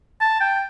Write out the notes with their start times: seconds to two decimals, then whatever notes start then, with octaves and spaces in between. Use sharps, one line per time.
0.21 A5
0.41 G5